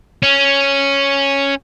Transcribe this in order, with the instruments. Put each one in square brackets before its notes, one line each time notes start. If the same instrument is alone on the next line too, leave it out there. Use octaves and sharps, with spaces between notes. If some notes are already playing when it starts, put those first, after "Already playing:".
[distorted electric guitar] C#4